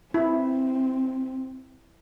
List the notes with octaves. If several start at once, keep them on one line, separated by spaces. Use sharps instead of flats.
C4 E4